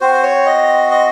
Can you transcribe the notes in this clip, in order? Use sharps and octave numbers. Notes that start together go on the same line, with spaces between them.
C4 F#4 C5
C#5
D#5
D#5